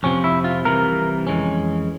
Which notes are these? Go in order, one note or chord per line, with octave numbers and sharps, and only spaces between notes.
F2 C3 F3 C4 C#4
E4
F4
C2 C3 E3 A#4
F2 E3 G#3 C#4